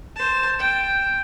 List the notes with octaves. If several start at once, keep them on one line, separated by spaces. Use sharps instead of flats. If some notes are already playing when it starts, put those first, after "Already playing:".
C5 A5
G5